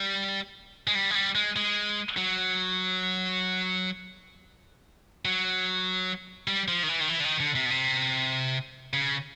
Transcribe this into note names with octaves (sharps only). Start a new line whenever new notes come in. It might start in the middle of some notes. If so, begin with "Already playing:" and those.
Already playing: G3
G#3
G3
G#3
G3
G#3
G#3
F#3
F#3
G3
F3
D#3
E3
D#3
E3
D3
D#3
D3
C3
B2
C3
C#3